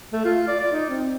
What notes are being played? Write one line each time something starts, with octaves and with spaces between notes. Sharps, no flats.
A3
F4
D5
D5
D#4
C4